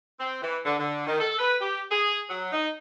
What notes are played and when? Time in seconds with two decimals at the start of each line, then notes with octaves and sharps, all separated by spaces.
0.20 C4
0.42 E3
0.65 D3
0.78 D3
1.06 D#3
1.20 A4
1.39 B4
1.61 G4
1.91 G#4
2.29 F#3
2.52 D#4